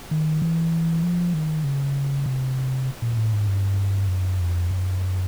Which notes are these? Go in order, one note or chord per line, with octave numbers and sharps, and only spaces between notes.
D#3
E3
F3
D#3
C#3
C3
A#2
A2
G#2
G2
F#2
F2
F#2